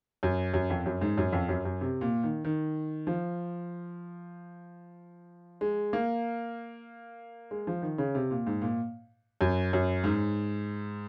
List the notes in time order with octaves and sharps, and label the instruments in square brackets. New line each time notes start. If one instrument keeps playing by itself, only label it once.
[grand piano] F#2
F#2
F2
F#2
G#2
F#2
F2
F#2
F#2
C3
A#2
D#3
D#3
F3
G#3
A#3
G#3
F3
D#3
C#3
C3
A#2
G#2
A#2
F#2
F#2
G#2